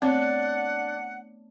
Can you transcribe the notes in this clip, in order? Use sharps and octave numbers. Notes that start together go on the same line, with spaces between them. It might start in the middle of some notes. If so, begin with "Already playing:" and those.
A3 B3 C4 D4 C#5 F#5